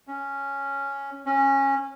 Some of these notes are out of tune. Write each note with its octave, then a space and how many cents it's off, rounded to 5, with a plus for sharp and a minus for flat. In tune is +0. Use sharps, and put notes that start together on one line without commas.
C#4 +0
C#4 -15